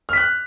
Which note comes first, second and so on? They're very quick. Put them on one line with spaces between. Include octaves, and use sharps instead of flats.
F6 B6 F#6